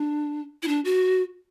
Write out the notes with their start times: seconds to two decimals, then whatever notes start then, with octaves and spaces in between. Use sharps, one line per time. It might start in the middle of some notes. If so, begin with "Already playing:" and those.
Already playing: D4
0.63 E4
0.68 D4
0.85 F#4